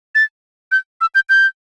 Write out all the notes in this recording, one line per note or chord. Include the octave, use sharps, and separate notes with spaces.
A6
G6
E6
G6
G6